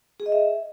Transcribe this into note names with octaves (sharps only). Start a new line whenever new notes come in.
G#4
D#5
E5